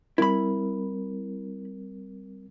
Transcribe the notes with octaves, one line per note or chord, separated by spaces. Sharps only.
G3 C4 E4 A#4 B5